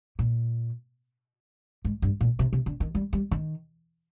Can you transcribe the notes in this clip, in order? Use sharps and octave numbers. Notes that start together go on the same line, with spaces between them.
A#2
G#2
G2
A#2
C3
C3
D3
D#3
G3
G3
D#3